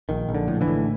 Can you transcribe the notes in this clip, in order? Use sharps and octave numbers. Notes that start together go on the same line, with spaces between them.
A#1 D#3
A#1
D3
A2
D3 E3
A2